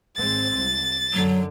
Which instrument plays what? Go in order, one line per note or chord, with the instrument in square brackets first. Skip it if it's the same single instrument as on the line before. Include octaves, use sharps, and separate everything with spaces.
[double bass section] G#1 G#3 C4 [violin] A6
[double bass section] C2
[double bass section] F#2 D3 [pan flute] F#3